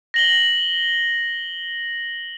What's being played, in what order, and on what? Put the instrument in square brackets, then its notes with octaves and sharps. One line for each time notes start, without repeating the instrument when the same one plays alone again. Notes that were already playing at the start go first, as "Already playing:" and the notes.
[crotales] A#6 F#7 G7